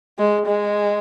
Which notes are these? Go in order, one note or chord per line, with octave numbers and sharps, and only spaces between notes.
G#3
G#3